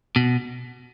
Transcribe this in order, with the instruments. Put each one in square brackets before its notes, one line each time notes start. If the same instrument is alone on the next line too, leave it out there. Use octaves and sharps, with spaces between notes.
[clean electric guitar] B2